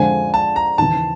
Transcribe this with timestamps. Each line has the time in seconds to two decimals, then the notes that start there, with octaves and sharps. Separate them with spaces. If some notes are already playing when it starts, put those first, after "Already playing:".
Already playing: F2 D3 F3 G#3 G#5
0.34 A5
0.56 A#5
0.78 D#2 C#3 E3 A5